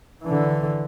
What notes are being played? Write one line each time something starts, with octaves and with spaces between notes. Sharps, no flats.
D3 E3